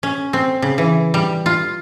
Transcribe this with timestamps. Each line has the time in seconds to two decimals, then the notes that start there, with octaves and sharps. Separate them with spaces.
0.03 C#4
0.33 C4
0.62 C#3
0.78 E3
1.14 G3
1.46 F4